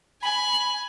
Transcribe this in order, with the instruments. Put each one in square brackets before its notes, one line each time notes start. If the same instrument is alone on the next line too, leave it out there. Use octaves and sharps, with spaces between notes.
[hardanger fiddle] G#5 [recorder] B5